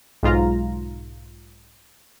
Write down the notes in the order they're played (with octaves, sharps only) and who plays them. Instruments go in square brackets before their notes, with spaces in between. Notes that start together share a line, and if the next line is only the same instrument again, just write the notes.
[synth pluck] B1 G#2 F4 A#5